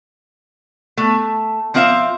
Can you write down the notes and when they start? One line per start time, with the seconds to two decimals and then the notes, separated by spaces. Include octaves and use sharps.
0.97 A3
1.74 F3 C4 F4 C5 E5 F5